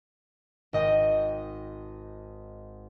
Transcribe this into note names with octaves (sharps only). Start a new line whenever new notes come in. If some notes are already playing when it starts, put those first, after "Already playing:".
G#1 D#5 G5 D#6